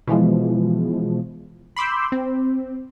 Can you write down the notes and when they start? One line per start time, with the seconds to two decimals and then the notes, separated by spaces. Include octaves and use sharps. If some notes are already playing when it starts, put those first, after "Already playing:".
0.07 B2 E3 F3 G#3
1.76 B5 C6 D6 E6 G6
2.12 C4